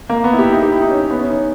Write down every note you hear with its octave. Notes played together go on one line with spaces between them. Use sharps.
A#3
B3
E4
G4
E4
D#4
G4
E4
D#4
C#4
C#4
B3
C#4
D#4